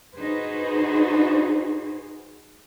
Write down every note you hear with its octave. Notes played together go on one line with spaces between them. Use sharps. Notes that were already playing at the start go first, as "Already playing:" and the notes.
D#4 F#4 G#4 B4 C5